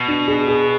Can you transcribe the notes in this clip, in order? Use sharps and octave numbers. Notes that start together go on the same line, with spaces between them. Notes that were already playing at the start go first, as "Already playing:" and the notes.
Already playing: B2
D4
G#4
G#4